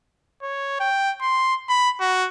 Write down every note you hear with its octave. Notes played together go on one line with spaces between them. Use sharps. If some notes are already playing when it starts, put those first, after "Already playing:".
C#5
G5
C6
B5
F#4